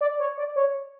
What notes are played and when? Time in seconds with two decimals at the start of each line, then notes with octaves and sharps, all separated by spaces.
0.01 D5
0.19 C#5
0.38 D5
0.56 C#5